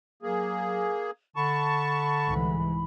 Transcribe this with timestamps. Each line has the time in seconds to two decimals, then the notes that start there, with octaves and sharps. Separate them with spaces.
0.22 F#3 A#3 G#4
1.36 D3 A5 B5 C#6
2.26 C2 G#2 E3